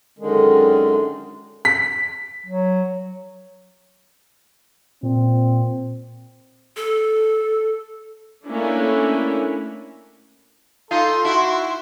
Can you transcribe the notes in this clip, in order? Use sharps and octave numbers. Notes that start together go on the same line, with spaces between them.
F#2 D3 D#3 G#3
B6
F#3
A#2 C4
A4
A3 A#3 C#4 D4 E4
D#4 F4 A4 C6
E4 F#4 E5